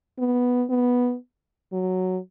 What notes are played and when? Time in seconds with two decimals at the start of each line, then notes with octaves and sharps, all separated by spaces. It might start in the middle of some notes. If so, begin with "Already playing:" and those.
0.19 B3
0.70 B3
1.73 F#3